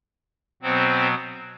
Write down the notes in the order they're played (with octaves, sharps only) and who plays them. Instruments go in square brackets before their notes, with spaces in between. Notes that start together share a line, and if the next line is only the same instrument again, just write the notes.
[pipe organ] B2 F#3 B3 C4 C5